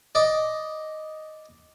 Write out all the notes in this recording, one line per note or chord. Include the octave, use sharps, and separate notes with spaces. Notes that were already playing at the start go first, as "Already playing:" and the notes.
D5 D#5